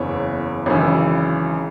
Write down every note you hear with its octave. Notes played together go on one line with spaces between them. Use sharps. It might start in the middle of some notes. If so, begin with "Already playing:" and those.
Already playing: F#1 E2 E3 C#5
G#1 F#2 C#3 E3